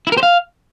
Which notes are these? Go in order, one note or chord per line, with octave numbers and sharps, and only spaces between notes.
E4
A#4
C5
F5